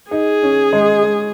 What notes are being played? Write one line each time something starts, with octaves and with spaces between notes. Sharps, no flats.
D#4 G#4
C#4
G#3
G#3